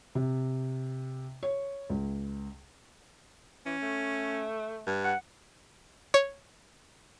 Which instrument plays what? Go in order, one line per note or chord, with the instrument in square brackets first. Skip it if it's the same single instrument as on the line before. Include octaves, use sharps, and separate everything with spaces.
[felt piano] C3
C#5
C#2
[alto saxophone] E3 [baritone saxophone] C#4
[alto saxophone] A3
[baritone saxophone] G2
[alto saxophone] F#5
[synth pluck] C#5